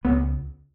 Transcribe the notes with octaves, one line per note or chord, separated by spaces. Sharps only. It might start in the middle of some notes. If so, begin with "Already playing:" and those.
C#2 B3